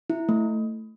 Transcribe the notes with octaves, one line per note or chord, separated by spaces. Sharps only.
E4
A3